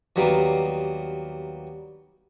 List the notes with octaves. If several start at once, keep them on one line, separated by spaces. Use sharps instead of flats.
D#2 F#3 G3 A#3 B3